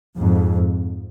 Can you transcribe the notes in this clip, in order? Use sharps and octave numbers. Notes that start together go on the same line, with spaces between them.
F2 G#2